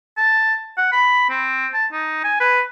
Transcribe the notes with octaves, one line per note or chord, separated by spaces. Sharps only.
A5
F#5
B5
C4
A5
D#4
G#5
B4